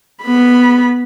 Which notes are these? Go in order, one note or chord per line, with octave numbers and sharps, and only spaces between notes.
B3 B5